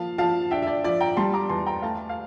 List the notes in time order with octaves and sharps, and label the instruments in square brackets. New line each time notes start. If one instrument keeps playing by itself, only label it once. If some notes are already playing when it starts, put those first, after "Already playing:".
Already playing: [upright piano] F3 A#3 F5 A5
F3 F5 A5
D4 E5 G5
E5
D5
F3 D5
G5 A#5
G3 A5 C6
A#5 D6
E2 A5 C6
G5 A#5
A3 F5 A5
F5